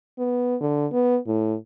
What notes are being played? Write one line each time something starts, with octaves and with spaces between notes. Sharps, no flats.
B3
D3
B3
A2